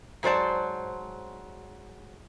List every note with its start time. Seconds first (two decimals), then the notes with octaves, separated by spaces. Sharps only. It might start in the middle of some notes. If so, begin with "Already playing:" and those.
0.23 G#2 F#3 C5 D5 A5